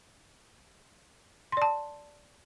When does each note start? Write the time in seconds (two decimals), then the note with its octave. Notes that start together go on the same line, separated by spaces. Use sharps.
1.52 C6
1.57 D5
1.62 A5